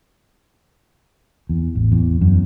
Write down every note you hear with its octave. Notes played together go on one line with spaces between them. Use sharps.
E2
A1
E2
F#2